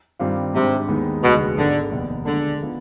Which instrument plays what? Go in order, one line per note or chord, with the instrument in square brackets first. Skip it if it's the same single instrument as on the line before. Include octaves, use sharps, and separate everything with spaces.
[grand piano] G2 D#3 G3 C4 F4
[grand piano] G#2 G3 D4 [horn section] C3
[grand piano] D#2 D#3 G#3 B3 D#4
[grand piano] F1 D#2 D3 G#3 [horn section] B2
[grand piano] G#1 G#2 D#3 G#3 B3 [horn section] D3
[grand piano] F1 D#2 D#3 B3 D#4
[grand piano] B2 G#3 D4 [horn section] D3
[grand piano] D#3 B3 F4